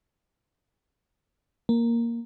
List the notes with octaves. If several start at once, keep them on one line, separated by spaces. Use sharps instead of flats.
A#3